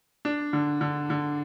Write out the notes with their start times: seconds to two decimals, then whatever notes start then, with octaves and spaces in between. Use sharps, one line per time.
0.25 D4
0.53 D3
0.81 D3
1.10 D3